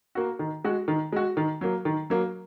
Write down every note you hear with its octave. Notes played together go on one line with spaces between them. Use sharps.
A#3 F#4
D#3
G#3 F#4
D#3
G#3 F#4
D#3
F#3 A#3
D#3
F#3 A#3